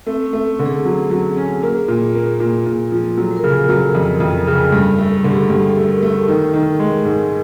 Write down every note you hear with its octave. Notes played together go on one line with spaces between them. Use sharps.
A3 C4
C#4
A3
D3
G#4
F#3
F#3
C#4
A#3 G#4
A#2
A#3
A#2
A#2
F3
F#3 A4
A#4
C#3
A4
F#3
A4
F2 A#4
F2
C#3
G2 A4
A4
A3
G#4
D3
G4
G2 G#4
A4
A3
A#4
A3
A4
D#3 A#4
D#3
G#3
G#2